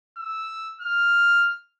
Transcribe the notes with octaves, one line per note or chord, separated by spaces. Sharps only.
E6
F6